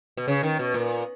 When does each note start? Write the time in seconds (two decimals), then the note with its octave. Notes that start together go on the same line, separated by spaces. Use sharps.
0.17 B2
0.28 C#3
0.43 D#3
0.59 B2
0.74 A#2